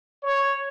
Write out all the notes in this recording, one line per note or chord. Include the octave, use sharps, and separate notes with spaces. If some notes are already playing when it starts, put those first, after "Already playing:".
C#5